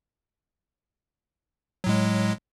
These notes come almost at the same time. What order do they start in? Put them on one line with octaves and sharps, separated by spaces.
F#3 A2 G#3